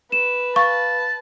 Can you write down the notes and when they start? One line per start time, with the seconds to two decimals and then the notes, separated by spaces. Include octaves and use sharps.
0.12 B4 E7
0.56 F5 A5 C#6